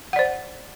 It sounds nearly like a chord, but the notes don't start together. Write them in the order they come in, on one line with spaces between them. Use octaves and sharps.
F#5 D5 C5